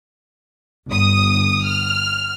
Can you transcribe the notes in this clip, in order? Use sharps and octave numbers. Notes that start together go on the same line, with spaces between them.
G1 D#6
F6